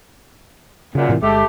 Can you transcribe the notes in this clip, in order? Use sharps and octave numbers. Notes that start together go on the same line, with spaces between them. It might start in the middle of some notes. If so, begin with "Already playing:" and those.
F#2 A#2 C#3
A2 C3 E3
G1 G#3 A3 G4